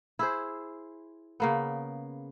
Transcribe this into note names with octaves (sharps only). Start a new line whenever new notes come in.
E4 G#4 C5
C#3 A#3 B3